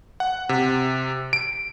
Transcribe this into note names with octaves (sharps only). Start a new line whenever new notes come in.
F#5
C3
D7